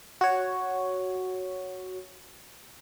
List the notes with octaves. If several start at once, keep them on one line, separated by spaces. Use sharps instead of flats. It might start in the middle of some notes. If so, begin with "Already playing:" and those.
F#4 C#5